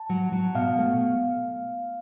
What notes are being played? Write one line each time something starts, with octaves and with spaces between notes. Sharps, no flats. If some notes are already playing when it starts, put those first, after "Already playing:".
Already playing: A5
F#3
F#3
B2 F5
A3